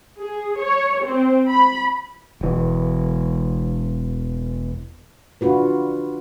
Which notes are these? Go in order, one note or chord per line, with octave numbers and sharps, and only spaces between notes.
G#4
C#5
C4
B5
E1 E3
D4 F4 F#4 B4